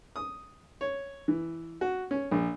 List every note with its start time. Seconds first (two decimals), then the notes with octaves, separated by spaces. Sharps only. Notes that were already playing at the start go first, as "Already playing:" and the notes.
0.16 D#6
0.81 C#5
1.28 E3
1.81 F#4
2.11 C#4
2.31 A#1